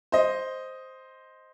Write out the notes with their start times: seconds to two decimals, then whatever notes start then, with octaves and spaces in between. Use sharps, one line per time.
0.12 C5 D#5